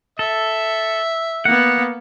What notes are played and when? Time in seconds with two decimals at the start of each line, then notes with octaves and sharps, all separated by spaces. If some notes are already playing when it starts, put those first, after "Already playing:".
0.19 A4 E5
1.45 A#3 B3 F#5